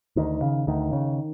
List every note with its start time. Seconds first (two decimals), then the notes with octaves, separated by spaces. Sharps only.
0.16 D2 D#3
0.42 C#3
0.67 D2 D#3
0.93 C#3